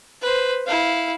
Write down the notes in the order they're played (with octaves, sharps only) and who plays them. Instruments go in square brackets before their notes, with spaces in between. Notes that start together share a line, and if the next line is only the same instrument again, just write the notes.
[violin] B4 C5
E4 F5